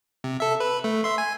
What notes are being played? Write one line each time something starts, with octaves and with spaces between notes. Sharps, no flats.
C3
A4 E5
B4
A3
E5 C6
G#5